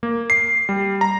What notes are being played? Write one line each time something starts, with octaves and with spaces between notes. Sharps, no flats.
A#3
C7
G3
A#5